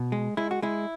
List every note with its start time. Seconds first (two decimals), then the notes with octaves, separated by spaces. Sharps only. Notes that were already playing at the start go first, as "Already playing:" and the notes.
Already playing: B2
0.12 G#3
0.37 G#3 E4
0.51 F#4
0.62 G#3 E4